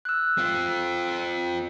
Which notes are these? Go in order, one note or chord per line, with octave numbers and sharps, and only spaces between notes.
E6 F#6
C4 F4